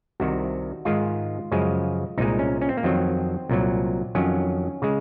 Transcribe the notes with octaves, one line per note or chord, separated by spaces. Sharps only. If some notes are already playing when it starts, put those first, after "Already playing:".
C2 C3 D#3 F#4
G#2 D#3 G#3 F4
F#2 C#3 F3 G#3
C2 A#2 G#3 D#4
C#4
C#4
C4
A#3
F2 D#3 F#3 C4
C2 A#2 F#3
F2 D#3 F#3 C#4
C#3 G#3